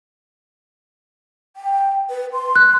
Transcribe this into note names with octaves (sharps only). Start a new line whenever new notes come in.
G5
B4
C6
F#6